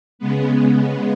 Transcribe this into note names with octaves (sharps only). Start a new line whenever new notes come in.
C#3 G#3 B3